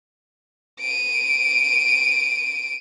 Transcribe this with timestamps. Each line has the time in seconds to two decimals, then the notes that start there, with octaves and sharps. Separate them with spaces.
0.80 D7 D#7